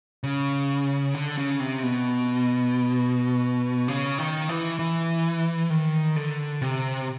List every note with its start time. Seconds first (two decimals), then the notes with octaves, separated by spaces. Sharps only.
0.24 C#3
1.14 D3
1.38 C#3
1.60 C3
1.83 B2
3.88 C#3
4.18 D#3
4.49 E3
4.79 E3
5.70 D#3
6.16 D3
6.62 C3